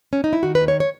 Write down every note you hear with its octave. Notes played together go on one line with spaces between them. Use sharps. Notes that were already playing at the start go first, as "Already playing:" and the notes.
C#4
D#4
E4
D#3 F#4
B4
D#2
C#5
C#5